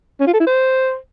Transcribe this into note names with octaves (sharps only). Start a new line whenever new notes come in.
C#4
F4
A4
E4
C5